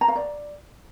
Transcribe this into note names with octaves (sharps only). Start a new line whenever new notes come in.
A#5
F5
D5